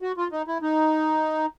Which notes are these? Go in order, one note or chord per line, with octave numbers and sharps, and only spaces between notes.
F#4
F4
D#4
E4
D#4